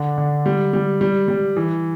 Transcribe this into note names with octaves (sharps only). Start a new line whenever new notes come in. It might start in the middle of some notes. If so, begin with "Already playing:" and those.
Already playing: D3 D4
D3
G3
G3
G3
G3
E3